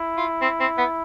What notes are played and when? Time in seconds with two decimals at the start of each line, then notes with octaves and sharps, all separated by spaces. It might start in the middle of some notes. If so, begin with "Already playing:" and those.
Already playing: E4
0.17 F4
0.42 C4
0.60 C4
0.78 B3